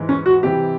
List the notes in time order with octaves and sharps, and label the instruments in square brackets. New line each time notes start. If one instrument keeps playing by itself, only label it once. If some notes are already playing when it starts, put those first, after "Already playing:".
Already playing: [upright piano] G#2 E3 G#3
[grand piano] C#4
F#4
[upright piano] C3 E3 G3 [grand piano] G4